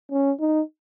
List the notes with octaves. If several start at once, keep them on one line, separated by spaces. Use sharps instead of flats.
C#4
D#4